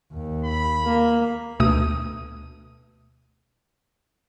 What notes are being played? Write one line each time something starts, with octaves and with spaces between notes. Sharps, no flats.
D#2
B5
A#3
D2 B2 A3 D#6